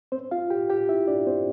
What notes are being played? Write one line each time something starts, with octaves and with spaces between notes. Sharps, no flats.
C4 C5
F4 F5
G4 G5
G4 G5
E4 E5
D4 D5
C4 C5